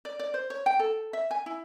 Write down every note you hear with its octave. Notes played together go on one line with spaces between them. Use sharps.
D5
D5
C5
C#5
G5
A4
E5
G#5
E4